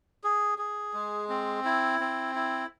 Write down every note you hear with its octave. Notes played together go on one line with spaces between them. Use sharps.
G#4
G#4
G#3
C4
E4
C4
E4